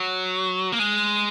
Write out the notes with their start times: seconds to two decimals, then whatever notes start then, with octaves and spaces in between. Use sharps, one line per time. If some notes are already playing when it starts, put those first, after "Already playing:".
Already playing: F#3
0.72 A#3
0.79 G#3